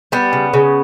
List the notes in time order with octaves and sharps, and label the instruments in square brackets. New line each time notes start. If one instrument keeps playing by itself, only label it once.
[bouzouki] G3 B3
C#3
C#3